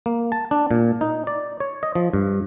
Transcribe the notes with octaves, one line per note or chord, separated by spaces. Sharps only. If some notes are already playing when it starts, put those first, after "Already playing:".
A#3
A5
D4
A#2
D#4
D5
C#5
D#5
F3
G2